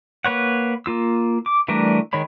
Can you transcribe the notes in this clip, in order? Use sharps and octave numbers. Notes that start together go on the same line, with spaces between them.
A#3 B4 C#5 F#5
A#3 F4 E6
D6
E3 G3 A3 D4 A#4
D#3 G#3 C#5 B5